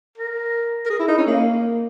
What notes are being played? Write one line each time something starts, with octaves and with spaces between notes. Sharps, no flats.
A#4
A#4
G#4
E4
D#4
C#4
A#3